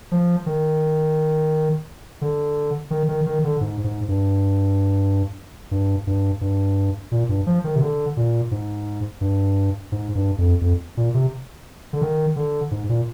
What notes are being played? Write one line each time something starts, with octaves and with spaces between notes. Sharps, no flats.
F3
D#3
D3
D#3
D#3
D#3
D3
G#2
G#2
G2
G2
G2
G2
A#2
G2
F3
D#3
C3
D3
A#2
G#2
G2
G#2
G2
F2
F2
A#2
C3
D3
D#3
D3
G#2
A#2